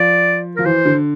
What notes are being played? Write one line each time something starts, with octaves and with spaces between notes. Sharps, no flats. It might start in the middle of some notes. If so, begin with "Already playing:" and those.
Already playing: F3 D5
F3 A#4
E3 C5
D3